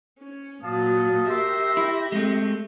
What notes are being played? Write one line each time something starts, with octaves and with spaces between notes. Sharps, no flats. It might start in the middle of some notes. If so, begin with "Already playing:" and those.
C#4
A#2 F#3 F5 A5 D#6
G4 A#4 E5 C6 E6 A#6
E4
G#3 A3 C4